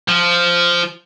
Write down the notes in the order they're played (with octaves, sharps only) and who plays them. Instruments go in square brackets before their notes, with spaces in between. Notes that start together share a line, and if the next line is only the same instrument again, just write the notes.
[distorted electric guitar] F3